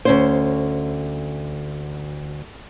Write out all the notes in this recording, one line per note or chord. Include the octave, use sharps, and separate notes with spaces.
D2 C#4 C5